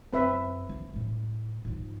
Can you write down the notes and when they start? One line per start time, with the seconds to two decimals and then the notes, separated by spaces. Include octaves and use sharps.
0.13 F#2 C4 B4 E5
0.69 A#3
0.93 A2 G3
1.65 G#2 F3